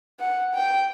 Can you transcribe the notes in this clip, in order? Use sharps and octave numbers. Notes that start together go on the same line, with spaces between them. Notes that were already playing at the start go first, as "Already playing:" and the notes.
F#5
G5